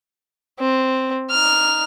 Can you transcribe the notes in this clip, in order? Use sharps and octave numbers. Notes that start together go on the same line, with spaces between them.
C4
D#4 F6